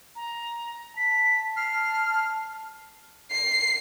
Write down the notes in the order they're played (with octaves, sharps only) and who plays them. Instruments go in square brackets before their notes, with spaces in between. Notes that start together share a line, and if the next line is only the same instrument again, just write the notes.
[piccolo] A#5
[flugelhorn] A5 [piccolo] B6
[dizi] F6 [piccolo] C7
[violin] C7